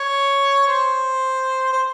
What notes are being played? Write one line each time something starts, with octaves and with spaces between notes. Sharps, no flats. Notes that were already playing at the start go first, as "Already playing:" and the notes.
Already playing: C#5
C5
C5